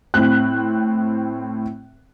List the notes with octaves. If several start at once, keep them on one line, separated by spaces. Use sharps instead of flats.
A2 C4 F#6